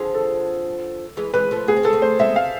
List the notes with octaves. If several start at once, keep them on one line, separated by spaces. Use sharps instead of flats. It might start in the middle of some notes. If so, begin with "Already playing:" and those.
Already playing: D3 F3 G#4
A4
E3 G#3
E3 G#3 B4
F3 A3
B3 G#4
C4
G#3 B3 A4
A3 C4
C5
G#3 B3 E5
F5